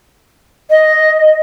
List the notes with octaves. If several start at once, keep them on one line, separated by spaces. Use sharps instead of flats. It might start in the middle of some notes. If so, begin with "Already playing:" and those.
D#5